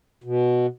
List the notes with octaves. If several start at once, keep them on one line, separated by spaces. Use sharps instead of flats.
B2